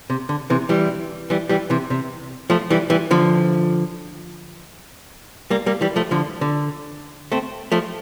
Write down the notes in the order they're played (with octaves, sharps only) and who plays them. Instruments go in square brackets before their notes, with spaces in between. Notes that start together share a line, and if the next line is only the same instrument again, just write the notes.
[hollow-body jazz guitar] C3
D3
C3 E3
E3 G3
E3 G3
E3 G3
C3 E3
C3
F3 A3
E3 G3
E3 G3
D3 F3
G3 A#3
G3 A#3
E3 G3
F3 A3
D3 F3
D3
A3 C4
F3 A3